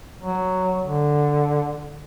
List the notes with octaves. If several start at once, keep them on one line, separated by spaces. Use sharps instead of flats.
F#3
D3